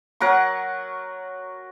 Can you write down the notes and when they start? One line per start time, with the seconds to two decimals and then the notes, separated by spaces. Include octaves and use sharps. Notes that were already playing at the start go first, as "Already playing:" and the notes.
0.20 F#3 A#4 F#5 C#6